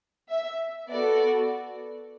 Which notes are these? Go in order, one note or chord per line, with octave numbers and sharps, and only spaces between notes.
E5
B3 F#4 A4 D5